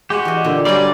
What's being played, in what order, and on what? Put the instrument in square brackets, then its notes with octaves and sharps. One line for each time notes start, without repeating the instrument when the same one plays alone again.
[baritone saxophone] G#3 [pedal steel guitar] F#4 G4
[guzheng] E3 D#5
[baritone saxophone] A#2 [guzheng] D3
[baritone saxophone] F#3 [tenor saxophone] G3 [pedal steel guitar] D5 [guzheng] G#5 C6